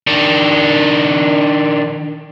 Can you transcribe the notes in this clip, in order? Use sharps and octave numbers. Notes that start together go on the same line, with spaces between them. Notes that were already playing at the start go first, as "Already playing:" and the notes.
D#3 D4